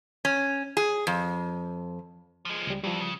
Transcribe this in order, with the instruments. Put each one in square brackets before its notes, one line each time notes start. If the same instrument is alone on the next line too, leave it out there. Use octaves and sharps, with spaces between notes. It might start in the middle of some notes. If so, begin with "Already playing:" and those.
[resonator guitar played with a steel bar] C#4
G#4
F2
[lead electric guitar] F3 G#3
[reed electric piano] C#2 G3
[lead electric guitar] F2 E3 [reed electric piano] F3 G3
[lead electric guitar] C#3